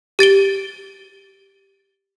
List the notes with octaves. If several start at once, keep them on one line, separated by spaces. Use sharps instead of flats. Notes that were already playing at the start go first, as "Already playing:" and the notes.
G4 A6 D7 G7